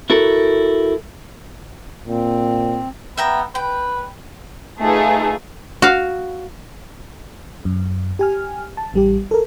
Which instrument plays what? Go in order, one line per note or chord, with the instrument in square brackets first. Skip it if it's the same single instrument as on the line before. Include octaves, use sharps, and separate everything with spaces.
[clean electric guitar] E4 F#4 A4 A#4
[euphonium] A#2 [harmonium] C4
[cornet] B3 [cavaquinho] E5 G5 A#5
[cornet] B4 [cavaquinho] G5
[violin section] A3 D#4 F4 G#4 A4 B4
[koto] F#4 F5
[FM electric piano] F#2
G4 G#5 F6
A5
A1 G3 G4
A4 A#4